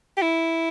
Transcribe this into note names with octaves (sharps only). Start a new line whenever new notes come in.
G4
E4